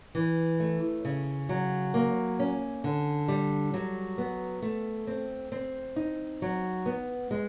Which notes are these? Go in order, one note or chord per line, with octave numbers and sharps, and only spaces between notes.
E3
A3
C#3
F#3
A#3
C#4
D3
G3
F#3
B3
A3
C4
C4
D#4
F#3
B3
G#3